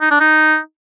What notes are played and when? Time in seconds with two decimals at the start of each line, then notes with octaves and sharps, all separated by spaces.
0.01 D#4
0.11 D4
0.20 D#4